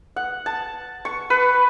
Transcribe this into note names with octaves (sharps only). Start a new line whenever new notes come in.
F#5
A5
C#6
B4